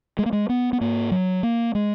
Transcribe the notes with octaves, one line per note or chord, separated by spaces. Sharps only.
G#3
A#3
G#3
B3
B3
G#2 A#3
F#3
A#3
G#3